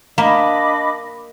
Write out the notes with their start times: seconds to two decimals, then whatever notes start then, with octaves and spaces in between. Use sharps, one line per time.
0.18 A#3 D4 D#5 B5 D6